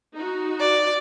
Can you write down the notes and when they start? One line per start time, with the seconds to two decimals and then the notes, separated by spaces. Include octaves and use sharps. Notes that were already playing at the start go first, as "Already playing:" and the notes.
0.15 D#4 F#4
0.60 D5